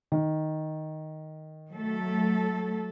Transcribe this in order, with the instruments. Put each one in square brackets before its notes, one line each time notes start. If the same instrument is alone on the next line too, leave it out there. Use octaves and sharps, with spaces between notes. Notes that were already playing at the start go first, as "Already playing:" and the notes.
[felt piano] D#3
[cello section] F#3 A3 A4